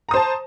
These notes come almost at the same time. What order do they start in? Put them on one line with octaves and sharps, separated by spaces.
A#5 D#6 C5 A5